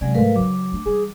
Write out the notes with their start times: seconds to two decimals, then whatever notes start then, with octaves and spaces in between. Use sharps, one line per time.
0.01 C3 F#3 G#3 C#4 D5 G#5
0.15 G#2 G#3 A3 A#4 B4 F5
0.36 C#3 F#3 D4 D6
0.72 A3 D4
0.86 E3 G3 G#4